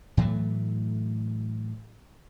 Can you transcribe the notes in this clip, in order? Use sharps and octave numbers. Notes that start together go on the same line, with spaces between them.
A2 E3 F#3 A3